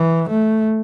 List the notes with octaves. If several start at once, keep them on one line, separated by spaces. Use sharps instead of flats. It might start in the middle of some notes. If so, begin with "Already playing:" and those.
Already playing: E3
A3